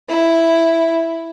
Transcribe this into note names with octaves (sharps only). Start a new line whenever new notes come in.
E4